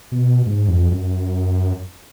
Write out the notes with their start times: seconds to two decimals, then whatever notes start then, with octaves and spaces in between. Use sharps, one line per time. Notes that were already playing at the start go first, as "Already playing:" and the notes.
0.12 B2
0.46 G#2
0.68 F2
0.91 F#2